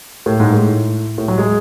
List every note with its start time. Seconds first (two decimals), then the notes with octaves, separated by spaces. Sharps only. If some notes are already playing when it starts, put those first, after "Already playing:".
0.26 A2
0.40 G#2
0.53 A2
1.18 A2
1.28 F#3
1.38 G#3